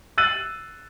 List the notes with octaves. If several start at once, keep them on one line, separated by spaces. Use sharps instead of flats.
E6 F#6 A6 D#7 F#7